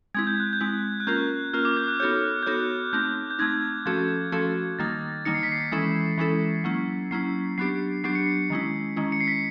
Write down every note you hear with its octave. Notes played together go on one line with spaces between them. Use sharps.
G#3 C4 E4 G#6
G6
F#6
G6
G#3 C4 E4
F#6
A#3 C#4 F4 A#4 G6
A#3 C#4 F4 A#4 F6
D6
G6
F#6
B3 D#4 F#4 A4 C#5 G6
G6
B3 D#4 F#4 A4 C#5 F#6
A3 C4 D#4 G6
G6
A3 C4 D#4 G#6
F3 A3 C#4 F#4 A4 G#6
F3 A3 C#4 F#4 A4
D#3 G3 A#3 D#4 A6
D#3 G3 A#3 D#4 C#7
C7
B6
C7
E3 G#3 C#4 E4 A4
E3 G#3 C#4 E4 A4
F#3 A#3 C#4 E4
F#3 A#3 C#4 E4 C7
F#3 B3 D4 G4 C7
F#3 B3 D4 G4 C7
C#7
C7
D#3 G#3 C#4 E4
D#3 G#3 C#4 E4
C#7
C7
B6